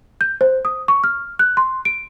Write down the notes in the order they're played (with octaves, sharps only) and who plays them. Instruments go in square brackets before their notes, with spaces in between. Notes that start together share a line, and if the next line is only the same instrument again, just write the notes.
[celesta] G6
C5
D#6
C#6
F6
F#6
C6
D7